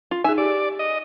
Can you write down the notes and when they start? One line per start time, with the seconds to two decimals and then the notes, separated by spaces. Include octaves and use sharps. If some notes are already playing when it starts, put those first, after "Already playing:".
0.11 F4
0.24 D#4 G#4 E5 G#5
0.38 G4 D5
0.79 D#5